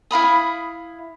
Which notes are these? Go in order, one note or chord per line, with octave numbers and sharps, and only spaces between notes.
E4 F5 B5 D#6